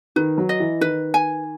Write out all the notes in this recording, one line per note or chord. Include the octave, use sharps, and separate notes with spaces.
D#3 B4
F#3
D#5
E3
D#3 B4
G#5